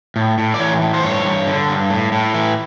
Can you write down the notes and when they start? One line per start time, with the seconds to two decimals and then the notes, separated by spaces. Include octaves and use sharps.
0.16 A2
0.38 A2
0.54 D5
0.59 E3 C#5
0.81 A2
0.94 C5
1.03 G2 C#5
1.25 G2
1.47 D3
1.68 G2
1.90 A2
2.12 A2
2.34 E3